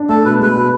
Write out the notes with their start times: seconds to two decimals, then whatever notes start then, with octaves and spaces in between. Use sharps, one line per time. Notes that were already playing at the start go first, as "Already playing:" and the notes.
Already playing: D4
0.09 A3 A4
0.25 B2 B4
0.40 G#3 B4
0.55 B2